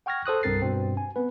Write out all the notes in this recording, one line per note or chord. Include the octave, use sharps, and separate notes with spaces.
F#5 G5 C#6 F6 G#6 A#6
A4 C5 D#6 F#6
C2 G2 C4 A#4 A6 C7
G2 B2 C4
G#5
B3 C4 B4